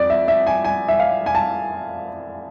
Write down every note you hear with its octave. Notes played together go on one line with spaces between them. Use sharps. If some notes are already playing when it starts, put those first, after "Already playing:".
Already playing: F2 D5
E5
E5
G#5
G#5
E5
F5
G#5
A5